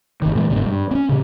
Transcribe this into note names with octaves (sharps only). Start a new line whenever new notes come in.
F#1 D#3
A#2 E3 G#3
F#1 G#2 B2 D3
G2
C4 C#4
A#2 C#3